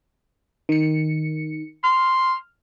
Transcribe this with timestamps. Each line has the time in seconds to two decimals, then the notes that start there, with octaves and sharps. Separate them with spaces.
0.69 D#3 C#7
1.84 C6 F6